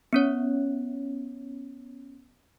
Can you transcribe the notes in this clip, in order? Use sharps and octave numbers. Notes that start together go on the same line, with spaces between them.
B3 C#4 C#5